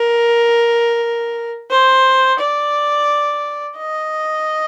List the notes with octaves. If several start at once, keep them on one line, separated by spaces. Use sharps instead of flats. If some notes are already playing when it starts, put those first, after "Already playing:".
Already playing: A#4
C5
D5
D#5